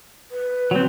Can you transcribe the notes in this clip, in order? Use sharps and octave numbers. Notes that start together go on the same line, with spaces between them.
B4
F#3 C4